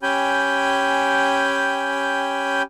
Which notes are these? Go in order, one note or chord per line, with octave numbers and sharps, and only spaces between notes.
C#4 G4 G5 G#5 B5 G6